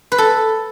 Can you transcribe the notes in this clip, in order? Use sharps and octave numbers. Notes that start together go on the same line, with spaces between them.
B4
A4